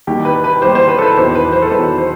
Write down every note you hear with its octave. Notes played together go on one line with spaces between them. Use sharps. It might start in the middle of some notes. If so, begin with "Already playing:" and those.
D#2 D#3 G3 G4
B4
B4
D#2 D#3 G3 C5
C5
B4
A4
B4
E1 E2 D#3 F#3 C5
B4
C5
A4
E1 E2 D#3 F#3 B4
C5